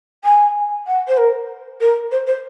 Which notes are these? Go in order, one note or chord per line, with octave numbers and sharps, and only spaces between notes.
G#5
F#5
C5
A#4
A#4
C5
C5